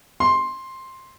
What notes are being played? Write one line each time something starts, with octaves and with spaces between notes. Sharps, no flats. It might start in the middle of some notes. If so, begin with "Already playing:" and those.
C6